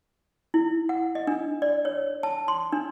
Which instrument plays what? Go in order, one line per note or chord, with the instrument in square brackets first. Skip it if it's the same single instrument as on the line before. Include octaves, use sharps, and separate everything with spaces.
[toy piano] E4
F#5
D#5
D4
D5
C#5
A5
C6
D4